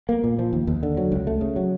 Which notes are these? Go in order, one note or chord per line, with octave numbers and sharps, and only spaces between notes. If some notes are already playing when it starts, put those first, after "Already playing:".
A#3
A#2
F3
D#2
D#2
D3
F#3
C#2
A3
C#3
F#3